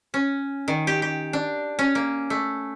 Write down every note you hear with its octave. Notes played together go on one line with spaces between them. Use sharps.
C#4
D#3
G4
G4
D4
C#4
A#3
A3